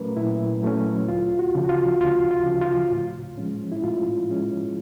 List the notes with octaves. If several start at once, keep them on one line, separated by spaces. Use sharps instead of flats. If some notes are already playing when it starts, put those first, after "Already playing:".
Already playing: A#2 F#3 A3 C#4 A#4 B4
A#2 E4
F#3 A3 C#4
D2 F4
F#4
C#3 F3
F#4
F4
D2 F4
F4
C#3 F3
F4
A2
F3 G#3 C#4
E4
A2 F4
F3 G#3 C#4